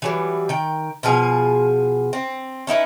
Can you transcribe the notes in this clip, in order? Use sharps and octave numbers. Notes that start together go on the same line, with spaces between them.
E3 F#3 G3
D#3 G5
B2 F3 F4 G#4
C4
C#4 D#4 E4 B4